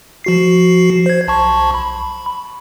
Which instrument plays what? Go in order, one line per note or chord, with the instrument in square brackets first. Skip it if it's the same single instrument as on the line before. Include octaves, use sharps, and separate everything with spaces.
[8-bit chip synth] F3 F#4 C7
C5 G#6
B1 A5 C#6
B5